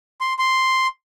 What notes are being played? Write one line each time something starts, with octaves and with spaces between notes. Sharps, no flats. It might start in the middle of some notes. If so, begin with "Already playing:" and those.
C6
C6